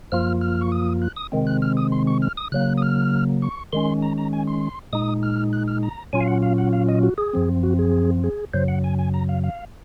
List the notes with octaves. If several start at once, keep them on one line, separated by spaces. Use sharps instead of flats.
F#2 F3 A#3 F4 F6
F6
C#6
D#6
F#6
D#6
C3 D#3 G#3 C4
F#6
F6
D#6
C6
C#6
F6
D#6
C#3 F#3 A#3 F#6
D#6
F6
C#6
D#3 G#3 C#4 C6
A#5
A#5
G#5
C6
A#2 G#3 D#4 D#6
F6
F#6
F6
A#5
A#2 F#3 C#4 F4 G#5
F5
F#5
F5
F#5
F5
D#5
F#4
G#4
F#2 F3 C4
F#4
G#4
G#4
F#2 C#3 F#3 C5
F#5
G#5
G#5
A#5
F5
F5